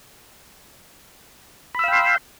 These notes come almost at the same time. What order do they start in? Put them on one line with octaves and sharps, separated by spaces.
B5 E6 F5 G5 C6